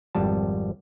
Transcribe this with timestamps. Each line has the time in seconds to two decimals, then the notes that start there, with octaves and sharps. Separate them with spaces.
0.15 G#1 F2 G3 A5